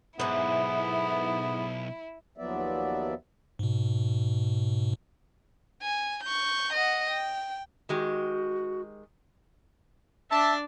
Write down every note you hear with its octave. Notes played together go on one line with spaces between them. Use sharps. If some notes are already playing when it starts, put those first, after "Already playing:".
B1 G#2 E3 B3 E4
D#2 F3 F#3 B3 D5 E5
G#2 B2
G#5
C#6 G6
D#5 F#5
G5
D#3 G#3 F#4 G4
D4 D5 E5 A5